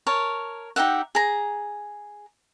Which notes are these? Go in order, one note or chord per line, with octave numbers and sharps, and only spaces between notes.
A#4 C#5 A5
D#4 G4 E5 F#5
G#4 A#5